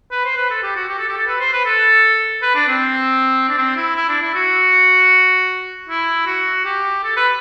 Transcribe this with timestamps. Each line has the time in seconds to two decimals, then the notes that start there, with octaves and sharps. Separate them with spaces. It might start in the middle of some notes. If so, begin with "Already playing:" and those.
0.12 B4
0.25 C5
0.37 B4
0.50 A4
0.63 G4
0.76 F#4
0.88 G4
0.98 A4
1.08 G4
1.17 A4
1.27 B4
1.40 C5
1.53 B4
1.65 A4
2.42 B4
2.55 D4
2.68 C4
3.49 D4
3.58 C4
3.77 E4
3.96 E4
4.09 D4
4.22 E4
4.34 F#4
5.88 E4
6.26 F#4
6.65 G4
7.04 A4
7.17 B4